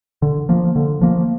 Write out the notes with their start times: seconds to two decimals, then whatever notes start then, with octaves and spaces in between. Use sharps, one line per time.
0.22 D3
0.49 F3 A#3
0.76 D3
1.01 F3 A#3